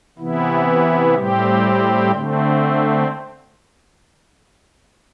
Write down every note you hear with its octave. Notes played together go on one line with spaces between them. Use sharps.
C3 E3 B3 E4
A2 G3 C4 G4
D3 A3 C4